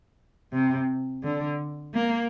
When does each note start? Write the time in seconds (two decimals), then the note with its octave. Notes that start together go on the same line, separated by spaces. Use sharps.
0.53 C3
1.23 D3
1.94 A#3